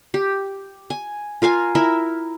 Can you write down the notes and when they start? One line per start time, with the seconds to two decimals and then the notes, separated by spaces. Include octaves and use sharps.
0.14 G4
0.90 G#5
1.42 F4 A#4 F5 G#5
1.75 E4 A#4 E5